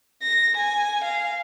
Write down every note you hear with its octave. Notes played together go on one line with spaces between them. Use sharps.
A#6
G#5
F5